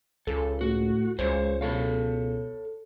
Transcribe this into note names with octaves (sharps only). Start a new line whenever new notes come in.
C#2 A4
A2 F#4
C#2 G#3 C5 C#5
B2 A4 C#5 F5